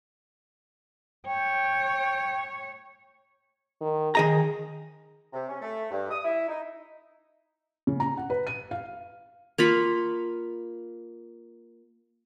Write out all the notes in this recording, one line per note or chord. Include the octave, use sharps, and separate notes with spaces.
C#5 G5
D#3
D#3 G#4 D#5 A#5
C3
C#4
A3
G2
D#6
E4
D#4
C#3
A#5
F#5
B4
D#7
F5
A#3 F4 B5 C#6